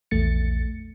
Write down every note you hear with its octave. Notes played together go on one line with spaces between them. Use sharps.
A#1 E2 A3 A6 C#7